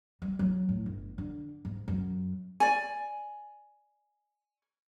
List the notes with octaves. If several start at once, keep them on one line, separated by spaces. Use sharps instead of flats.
G3
F#3
A2
G1
D3
G#2
F#2
D5 G#5